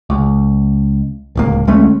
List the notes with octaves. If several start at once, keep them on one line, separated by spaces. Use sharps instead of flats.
C#2
D1 C#2 A#3
D2 G#3 A3 C#4